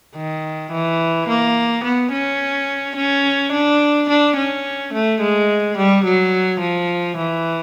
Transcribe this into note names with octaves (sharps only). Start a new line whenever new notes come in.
D#3
E3
A#3
B3
C#4
C#4
D4
D4
C#4
A3
G#3
G3
F#3
F3
E3